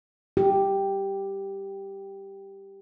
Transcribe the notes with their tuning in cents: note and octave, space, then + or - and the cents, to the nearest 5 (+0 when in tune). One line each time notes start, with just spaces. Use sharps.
G4 +0